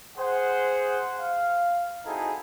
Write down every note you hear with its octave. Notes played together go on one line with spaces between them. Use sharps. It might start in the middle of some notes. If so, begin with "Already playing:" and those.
G#4 C5 F#5
F5
C4 D#4 E4 F#4 G#4 A4